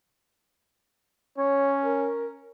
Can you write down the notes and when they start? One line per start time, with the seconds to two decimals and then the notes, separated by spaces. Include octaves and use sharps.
1.38 C#4 C#5
1.84 A#4